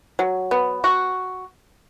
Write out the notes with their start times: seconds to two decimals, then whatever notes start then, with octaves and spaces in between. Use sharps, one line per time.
0.19 F#3
0.51 B3
0.84 F#4